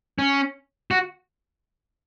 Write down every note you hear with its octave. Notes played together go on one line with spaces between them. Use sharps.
C#4
F#4